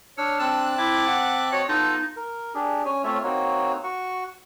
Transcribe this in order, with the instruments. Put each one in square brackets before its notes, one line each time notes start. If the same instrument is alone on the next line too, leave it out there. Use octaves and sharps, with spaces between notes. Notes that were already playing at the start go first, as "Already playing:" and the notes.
[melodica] D4 [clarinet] C#5 [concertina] E6 F6
[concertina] C4 A5 F#6 [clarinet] E6
[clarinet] E4 [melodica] E5 D6
[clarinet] F#5
[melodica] F#4 D#5 [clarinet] C#5
[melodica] B3 F4 [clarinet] D#4 [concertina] A4 A5 A#5
[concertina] A#4
D4 G4 G#4
C#4 C#5 G#5
A3 C4 F4 C#5 E5 F6
A#3 C4 D#4 F#4 C#5
F#4 C#6